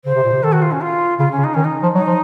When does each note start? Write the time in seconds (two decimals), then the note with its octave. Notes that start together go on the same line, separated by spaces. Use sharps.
0.05 C#3 C5
0.14 C3
0.23 A#2
0.33 C3
0.42 D#3 A4
0.52 F#4
0.62 F4
0.72 C#4
0.81 F4
1.19 C#3 F4
1.31 C#4
1.38 C#3
1.44 D#4
1.54 D#3 C#4
1.64 D#4
1.83 F3
1.95 F#3 D#4
2.07 F3